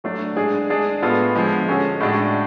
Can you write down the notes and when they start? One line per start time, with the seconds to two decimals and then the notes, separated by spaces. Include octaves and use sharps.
0.04 F#3 A3 D4
0.37 G#3 D4 G#4
0.70 G#3 D4 G#4
1.02 A2 G#3 B3 F4 A4
1.35 D3 F3 G#3
1.68 G#3 C#4 F#4 A4
2.00 A2 G#3 D4 F#4